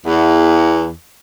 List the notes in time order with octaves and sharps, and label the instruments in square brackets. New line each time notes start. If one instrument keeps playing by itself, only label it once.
[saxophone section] E2